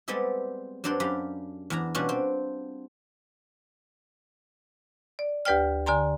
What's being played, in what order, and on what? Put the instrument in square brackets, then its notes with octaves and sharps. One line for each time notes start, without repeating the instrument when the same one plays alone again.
[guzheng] G3 G#3 B3 C4 G4 A4
G2 F#3 D4 A4 C5 G5
F#2 G4 D5 F5 B5
E2 D4 E4 A#5
B2 G3 C#4 D4 F4 F#4
C4
[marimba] D5
D2 G4 B4 D5 G5 F6
D3 D5 G#5 A#5 C6